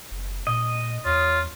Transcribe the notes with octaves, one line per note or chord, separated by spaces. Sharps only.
F#1
A#2 D#5
E2 F4 C#5